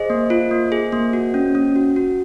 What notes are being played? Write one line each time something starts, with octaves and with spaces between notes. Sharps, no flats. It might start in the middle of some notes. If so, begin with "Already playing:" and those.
Already playing: G#4 C5 D#5
A#3
F4
A#3
G#4
A#3
F#4
C#4
C#4
F#4
F#4